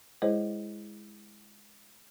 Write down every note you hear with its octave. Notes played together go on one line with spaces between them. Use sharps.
G#3 E4 G#4 C5 C#5 D#5